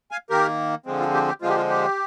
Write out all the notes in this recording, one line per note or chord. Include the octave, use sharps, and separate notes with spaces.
F5 G#5
D#3 A#3 G4 A#4
D3 F3 G#3 C4
F4
G4
G4
D3 F3 G#3 C4 F4
G4
F4
G4